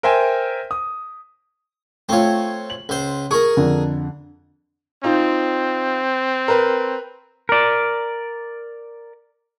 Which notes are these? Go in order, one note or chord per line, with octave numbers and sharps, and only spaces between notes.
A#4 C5 E5 G5 G#5
D#6
A3 C4 F4 C#5
F#7
C#2 C5
G#4 A#4 C#6
F2 D3
C4 D#4 F4
A#4 B4
A#4 D5